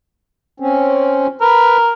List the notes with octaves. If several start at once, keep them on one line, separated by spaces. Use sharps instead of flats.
C4 C#4
A#4 B4